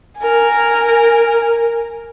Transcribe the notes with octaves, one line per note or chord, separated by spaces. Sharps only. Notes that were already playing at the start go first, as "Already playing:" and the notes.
A#4 G#5